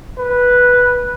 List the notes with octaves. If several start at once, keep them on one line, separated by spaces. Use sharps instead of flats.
B4